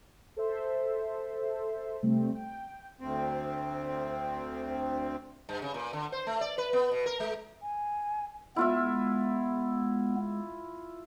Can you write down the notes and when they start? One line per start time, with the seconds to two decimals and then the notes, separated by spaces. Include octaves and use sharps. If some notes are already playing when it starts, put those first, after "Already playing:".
0.36 A4 C5 E5
2.03 C3 G3 A3 C4
2.35 G5
3.00 D2 C4
5.49 G2
5.62 C#3
5.74 A#2
5.93 D3
6.12 C5
6.27 A3
6.41 D5
6.58 B4
6.73 B3
6.91 B2
7.06 A#4
7.20 G#3
7.62 G#5
8.56 G#3 B3 E4 F4 E5